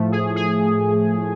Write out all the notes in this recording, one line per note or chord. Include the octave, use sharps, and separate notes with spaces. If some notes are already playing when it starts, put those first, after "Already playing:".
Already playing: A2 F3 A3
G#4
G#4